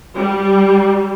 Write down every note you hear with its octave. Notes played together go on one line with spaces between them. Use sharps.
G3